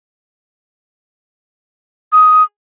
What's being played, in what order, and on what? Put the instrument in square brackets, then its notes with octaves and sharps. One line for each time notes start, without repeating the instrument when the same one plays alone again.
[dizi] D#6